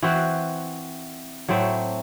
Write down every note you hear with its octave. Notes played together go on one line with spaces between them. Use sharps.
E3 C4 F#4 C5
A2 F#3 A3 C4